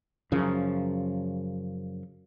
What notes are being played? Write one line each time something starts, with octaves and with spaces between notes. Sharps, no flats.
F#2 C#3 F3